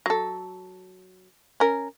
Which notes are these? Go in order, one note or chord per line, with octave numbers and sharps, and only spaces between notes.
F#3 A4
C#4 A#4